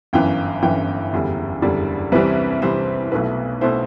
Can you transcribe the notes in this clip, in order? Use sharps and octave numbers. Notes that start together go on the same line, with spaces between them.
G1 F#2 E3 G5
G1 F#2 E3 G5
F#1 E2 D3 G3
F#1 E2 D3 G3 D5
C2 C3 E3 G3 C4 B4
C2 C3 E3 G3 C4 C5
B1 B2 A3 E4 B4
B2 A3 E4 C5